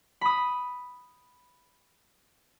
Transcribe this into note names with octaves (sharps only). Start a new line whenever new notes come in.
B5 D#6